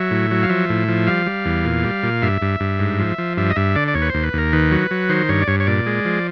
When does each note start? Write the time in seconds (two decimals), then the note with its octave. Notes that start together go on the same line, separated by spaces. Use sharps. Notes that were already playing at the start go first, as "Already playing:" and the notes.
Already playing: F#3 E5
0.11 A2
0.31 F#3
0.43 F5
0.49 F3 E5
0.69 A2
0.88 F3
1.07 G3 F5
1.26 G3
1.45 E2
1.65 A#2
1.84 G3
2.03 A#2
2.22 G2 E5
2.42 G2
2.60 G2
2.80 G#2
2.99 F3
3.18 F3
3.37 G2 E5
3.50 D#5
3.56 G2 E5
3.76 D3 D5
3.88 D5
3.95 D#2 C#5
4.02 B4
4.09 D#2 C5
4.23 B4
4.33 D#2 A#4
4.53 D#3 B4
4.71 F#3
4.91 F#3
5.09 D#3 C5
5.29 G2 C#5
5.42 D5
5.48 G2 C#5
5.60 C#5
5.67 A#2 D5
5.86 G#3
6.05 F3